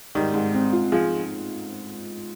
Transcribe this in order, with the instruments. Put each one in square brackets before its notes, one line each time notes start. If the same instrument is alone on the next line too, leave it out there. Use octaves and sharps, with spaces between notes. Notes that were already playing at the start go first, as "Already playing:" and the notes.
[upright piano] G#2 [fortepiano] D#3 G3
[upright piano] G#2
C4
F4
[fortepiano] F3 G#3 [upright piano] F4